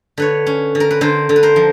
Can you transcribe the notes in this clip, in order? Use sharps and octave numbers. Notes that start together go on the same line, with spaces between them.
D3 B4 C#5
C#4
D3
A#4
B4
D3 A#4 C5
D3
B4
A#4 C5
F3